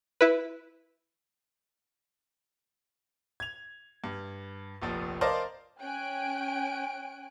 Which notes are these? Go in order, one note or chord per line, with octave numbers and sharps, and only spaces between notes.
E4 B4
G#6 F7
G2
F1 A#1 F3
A#4 C5 D5 D#5 F5 A5
C#4 G5 G#5 F#6 D7